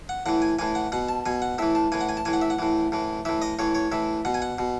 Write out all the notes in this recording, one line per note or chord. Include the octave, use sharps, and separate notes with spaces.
F#5
A2 E3 F#5
G#5
A2 E3 G#5
F#5
B2 F#5
A5
B2 G#5
F#5
A2 E3 E5
A5
A2 E3 G#5
F#5
G#5
A5
A2 E3 G#5
F#5
E5
F#5
A2 E3
A2 E3
A2 E3 E5
D#5
A2 E3 C#5
C#5
A2 E3 E5
B2 F#5
G#5
F#5
B2